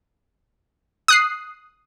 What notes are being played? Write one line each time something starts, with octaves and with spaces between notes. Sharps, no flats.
D#6 F#6 C7